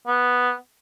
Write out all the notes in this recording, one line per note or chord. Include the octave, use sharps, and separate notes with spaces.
B3